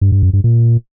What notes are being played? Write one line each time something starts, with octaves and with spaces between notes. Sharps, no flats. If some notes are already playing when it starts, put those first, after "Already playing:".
G2
G2
F#2
G2
A#2